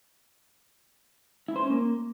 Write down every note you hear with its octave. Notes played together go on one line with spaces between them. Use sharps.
E4
C5
C#4
A#3